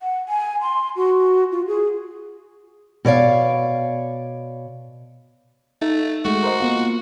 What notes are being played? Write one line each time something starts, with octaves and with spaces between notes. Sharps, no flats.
F#5
G#5
C6
F#4
F4
G#4
B2 C#5 D5 F5
A3 D#4
G#3 A3 F#4
A#4 C5 D#5
A#3 B3 F4